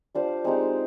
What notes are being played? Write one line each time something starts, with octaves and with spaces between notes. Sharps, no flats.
G3 D4 F4 C5
G#3 C4 D#4 G4